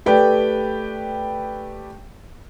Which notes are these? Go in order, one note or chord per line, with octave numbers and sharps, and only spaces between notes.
A3 G4 B4 D5 G5